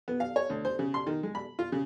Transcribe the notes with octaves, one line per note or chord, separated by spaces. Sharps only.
B3
F5
C#5
D2
C5
C#3
C6
D#3
G#3
B5
F4
C#3